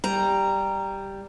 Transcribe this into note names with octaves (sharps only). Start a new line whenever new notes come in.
G3 A#5